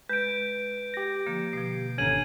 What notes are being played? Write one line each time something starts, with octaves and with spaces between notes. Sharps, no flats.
G#3 B4 G6 D7
G4 A#6
D3 F3 A#3
B2 F3 C7
G#1 D3 C#4 G#5 A#5 G#6 D#7 F#7